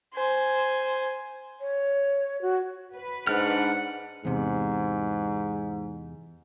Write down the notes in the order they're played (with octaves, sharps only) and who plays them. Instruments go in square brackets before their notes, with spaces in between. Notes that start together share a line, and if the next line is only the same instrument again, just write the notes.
[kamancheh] C5 G#5
[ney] C#5
F#4
[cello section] B4
[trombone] G#2 [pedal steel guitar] D4 F6 [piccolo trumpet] F#5
[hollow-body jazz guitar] E2 C3 [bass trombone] G#2